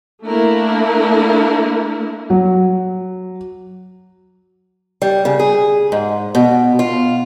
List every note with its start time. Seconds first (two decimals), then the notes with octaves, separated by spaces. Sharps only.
0.25 A3 A#3 D4 E4 A#4
2.30 F#3
5.02 G3
5.25 C#3
5.39 G#4
5.92 G#2
6.35 B2
6.79 F4